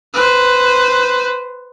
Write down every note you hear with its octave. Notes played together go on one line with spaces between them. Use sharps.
B4 C5